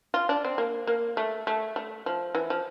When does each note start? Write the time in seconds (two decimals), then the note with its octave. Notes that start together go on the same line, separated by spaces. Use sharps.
0.14 F4
0.29 D4
0.44 C4
0.58 A#3
0.87 A#3
1.17 A3
1.47 A3
1.76 A3
2.06 F3
2.35 E3
2.50 F3